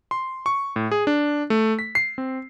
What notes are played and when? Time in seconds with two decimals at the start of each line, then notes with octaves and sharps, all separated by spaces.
0.11 C6
0.46 C#6
0.76 A2
0.91 G#4
1.07 D4
1.50 A3
1.79 B6
1.95 C7
2.18 C4